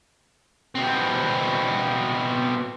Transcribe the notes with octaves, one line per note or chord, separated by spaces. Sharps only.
B2 C4